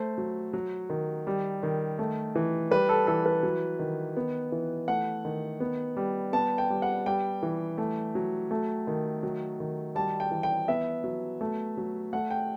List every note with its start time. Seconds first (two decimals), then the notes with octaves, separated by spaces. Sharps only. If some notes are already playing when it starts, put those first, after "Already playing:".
Already playing: A3 C5
0.18 F#3
0.53 F#3
0.90 D#3
1.27 G3
1.63 D#3
1.99 A3
2.35 E3
2.71 G3 B4
2.89 A4
3.07 E3 A4
3.26 B4
3.43 F#3
3.79 D#3
4.17 B3
4.52 E3
4.88 A3 F#5
5.25 D#3
5.60 B3
5.97 G3
6.33 B3 A5
6.58 G5
6.70 G3
6.82 F#5
7.06 G3 G5
7.43 E3
7.78 A3
8.15 F#3
8.51 A3
8.87 D#3
9.23 F#3
9.60 D#3
9.95 G3 A5
10.20 G5
10.31 E3
10.43 G5
10.68 B3 E5
11.04 F#3
11.41 A3
11.77 F#3
12.13 A3 F#5
12.31 G5